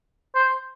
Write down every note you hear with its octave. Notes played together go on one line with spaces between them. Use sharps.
C5